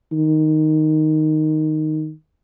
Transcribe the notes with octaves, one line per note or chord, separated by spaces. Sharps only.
D#3